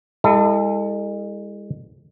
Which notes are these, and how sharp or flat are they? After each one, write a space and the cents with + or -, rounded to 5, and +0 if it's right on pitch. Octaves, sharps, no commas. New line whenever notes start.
G#3 -35 E4 +0 A4 +25